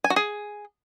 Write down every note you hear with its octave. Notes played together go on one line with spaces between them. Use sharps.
G#5
F#4
G#4